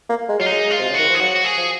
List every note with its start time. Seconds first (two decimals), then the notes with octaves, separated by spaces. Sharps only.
0.09 A#3
0.28 G#3
0.39 F#3 F4
0.46 D#4
0.52 G#3
0.71 F4
0.79 C3
0.89 C#3
0.95 D#3 F#4
1.10 F3
1.15 G#4
1.20 F#3 F#4
1.36 F#4
1.45 G#4
1.57 F3